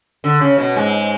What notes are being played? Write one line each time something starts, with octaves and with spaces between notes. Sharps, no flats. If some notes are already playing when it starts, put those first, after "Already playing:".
D3
C#3
B2
G#2 G#3